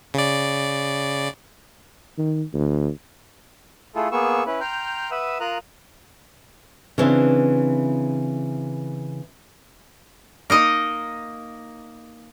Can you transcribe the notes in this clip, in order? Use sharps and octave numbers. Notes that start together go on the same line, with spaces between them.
C#3 D5
D#3
D2
A3 E4 F4 G#4 A4
A#3 B3 G#4 C#6 E6
C#4 E4 B4
G5 A#5 C6 F6 G6
B4 E5 F#5 D#6 E6
F4 A#4 A#5 D#6 F#6
C#3 E3 C4 D4 E4
A#3 D#4 D#5